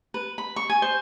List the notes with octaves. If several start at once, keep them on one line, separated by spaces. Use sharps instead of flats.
B4
B5
C#6
G#5
C5